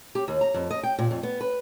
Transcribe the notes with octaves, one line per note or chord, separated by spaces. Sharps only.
G4
D#2
A#5
F2
D#5
G5
A#2
F2
B3
B4